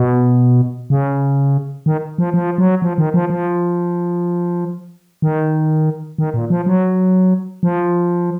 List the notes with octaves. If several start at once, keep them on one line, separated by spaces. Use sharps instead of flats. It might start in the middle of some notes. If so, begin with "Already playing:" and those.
Already playing: B2
C#3
D#3
F3
F3
F#3
F3
D#3
F3
F3
D#3
D#3
A#2
F3
F#3
F3